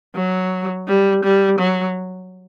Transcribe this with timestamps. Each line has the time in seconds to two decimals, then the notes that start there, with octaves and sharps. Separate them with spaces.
0.15 F#3
0.88 G3
1.24 G3
1.59 F#3